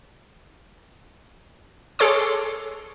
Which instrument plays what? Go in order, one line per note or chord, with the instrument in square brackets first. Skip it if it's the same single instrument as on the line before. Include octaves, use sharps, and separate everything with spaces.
[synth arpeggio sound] G#4 A4 C#5 C6 D6